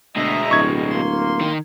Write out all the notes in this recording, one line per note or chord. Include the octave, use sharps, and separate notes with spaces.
D2 B2 G#3 D#5 E5 A#5
D1 C#6 G#6
A#3 C6
D#3